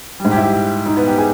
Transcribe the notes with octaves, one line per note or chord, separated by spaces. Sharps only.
G3
G#2
G4
E4
G4
G4
D#4
B3
G4
G#4